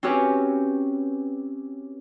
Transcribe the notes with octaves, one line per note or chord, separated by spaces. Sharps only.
C4 C#4 F#4 G4 B4 C#5